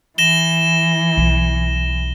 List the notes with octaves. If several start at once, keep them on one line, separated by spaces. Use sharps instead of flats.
E3 A#6 E7 G7
B1 F4